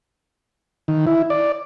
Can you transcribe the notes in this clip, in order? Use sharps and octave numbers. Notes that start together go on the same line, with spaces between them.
D#3
E4
D5